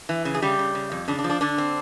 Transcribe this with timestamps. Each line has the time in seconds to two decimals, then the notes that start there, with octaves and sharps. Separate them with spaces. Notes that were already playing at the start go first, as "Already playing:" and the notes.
0.09 E3
0.25 C#3
0.35 G#4
0.42 C#3 G3 G4
0.59 C#3
0.75 C#3
0.92 F2
1.08 C#3 D4
1.19 D4
1.24 F3
1.30 D4
1.41 D3 D4
1.58 C4